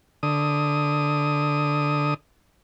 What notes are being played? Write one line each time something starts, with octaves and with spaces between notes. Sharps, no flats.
D3 D#6